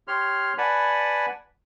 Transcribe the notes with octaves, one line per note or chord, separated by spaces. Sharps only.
G4 C#5 C6 F6
B4 D5 F#5 G#5 A5 B5